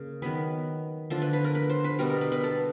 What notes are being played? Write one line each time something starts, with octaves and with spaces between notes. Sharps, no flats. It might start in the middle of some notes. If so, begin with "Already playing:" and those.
Already playing: C#3 A#3
D#3 F#3 B3 B4
D3 F3 A3 C5
B4
B4
A#4
B4
C5
B4
B2 G3 B3 A#4
A#4
B4
B4
A4